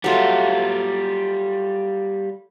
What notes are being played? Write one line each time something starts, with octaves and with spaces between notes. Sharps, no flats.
F#3 G3 A3 F4